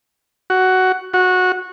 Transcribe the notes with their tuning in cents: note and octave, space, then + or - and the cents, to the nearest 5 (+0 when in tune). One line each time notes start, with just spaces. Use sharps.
F#4 +10
F#4 -15